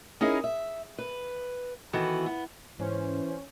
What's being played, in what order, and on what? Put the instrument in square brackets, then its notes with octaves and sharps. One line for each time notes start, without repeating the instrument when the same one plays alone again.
[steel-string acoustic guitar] C#4 D#4 E4 G#4 A#4
E5
B4
D#3 E3 B3 F#4 A4
B3
[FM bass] G#2 [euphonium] E3 [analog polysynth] C#4 [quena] C5